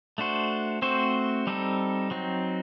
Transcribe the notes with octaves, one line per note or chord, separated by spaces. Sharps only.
A3 D4 F#4 C5
A3 C4 F#4 C5
G3 C4 D#4 A4
F#3 C4 D#4